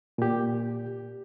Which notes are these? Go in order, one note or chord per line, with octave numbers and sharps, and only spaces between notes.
A#2 G4